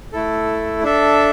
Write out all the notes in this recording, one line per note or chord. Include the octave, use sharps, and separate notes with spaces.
A3 E4 A4
D4 A4 E5